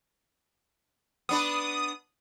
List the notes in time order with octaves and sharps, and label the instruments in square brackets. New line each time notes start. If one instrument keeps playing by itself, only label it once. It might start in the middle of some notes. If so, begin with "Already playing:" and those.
[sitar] B3 D4 B4 [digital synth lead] D#6